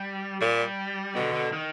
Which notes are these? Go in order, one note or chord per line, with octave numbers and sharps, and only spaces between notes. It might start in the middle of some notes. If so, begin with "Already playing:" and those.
Already playing: G3
A#2 G3
B2 D3
D3
D#3